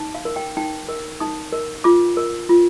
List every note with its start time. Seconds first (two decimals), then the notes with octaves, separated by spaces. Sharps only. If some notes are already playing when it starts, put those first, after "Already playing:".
Already playing: D#4
0.15 F5
0.25 A#4
0.36 G5
0.57 D#4 G5
0.89 A#4
1.20 D#4 D#6
1.53 A#4
1.84 F4 D6
2.17 A#4
2.49 F4